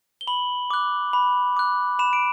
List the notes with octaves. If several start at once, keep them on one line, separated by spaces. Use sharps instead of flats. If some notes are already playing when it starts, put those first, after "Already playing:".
G7
B5 F#7
D6 F#6
B5
D6 F#6
B5 E7
D7